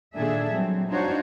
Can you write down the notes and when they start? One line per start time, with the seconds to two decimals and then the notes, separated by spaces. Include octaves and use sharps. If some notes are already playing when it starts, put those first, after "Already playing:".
0.14 A#2 D#3 D4 G#4 A4 E5
0.54 F#3 G3 C4
0.89 D4 D#4 F4 F#4 C5 C#5